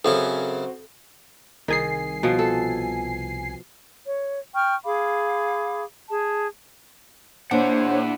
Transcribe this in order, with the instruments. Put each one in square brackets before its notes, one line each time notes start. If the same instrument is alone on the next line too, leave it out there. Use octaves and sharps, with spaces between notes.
[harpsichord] F#2 C#3 C#4 [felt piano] C4 F#4 C5 [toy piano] A4
[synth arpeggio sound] C2 G#5 C7 [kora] D#3 G#4
[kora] B2 F3
A4
[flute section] C#5
G5 C#6 F6
G#4 F5 B5 D6
G#4 A5
[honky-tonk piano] A#2 [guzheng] D4 [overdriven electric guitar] E4 F#5 [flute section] C5 C#5